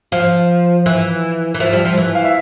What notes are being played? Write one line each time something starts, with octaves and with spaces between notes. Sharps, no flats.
F3 F5
E3
E3
F3 E5
G3
F3
E3
F5
E5